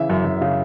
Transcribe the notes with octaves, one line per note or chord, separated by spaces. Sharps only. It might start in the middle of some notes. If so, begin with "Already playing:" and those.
Already playing: C#3 E3 E5
F#2
F#2
C#3